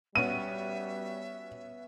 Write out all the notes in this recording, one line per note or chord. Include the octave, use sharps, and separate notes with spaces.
G3 B3 C#4 F#4 E5 D#7